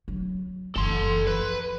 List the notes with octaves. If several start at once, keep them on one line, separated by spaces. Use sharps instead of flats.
F#3
F#1 A4 C6
F3 B4